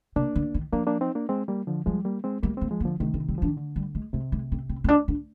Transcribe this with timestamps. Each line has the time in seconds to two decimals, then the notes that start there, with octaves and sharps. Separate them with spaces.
0.16 C3 A#3 D4
0.36 D3
0.54 D#3
0.73 F3 A#3 D4
0.87 A#3 D4
1.01 C4 D#4
1.15 A#3 D4
1.29 G#3 C4
1.48 G3 A#3
1.67 D3 F3
1.86 F3 G3 G#3
2.05 G3 A#3
2.24 G#3 C4
2.43 G3 G#3 A#3
2.57 G#3 A#3 C4
2.71 F3 G#3
2.80 A#3
2.85 D3 F3
3.00 C3 D#3 G#3
3.14 C4
3.29 G3 C4
3.38 F3
3.42 D4
3.47 D#3
3.56 D3
3.76 G3
3.95 G#3
4.13 C3 G#3
4.32 G#3
4.52 C4
4.69 C4
4.84 C4
4.88 D4
5.08 D4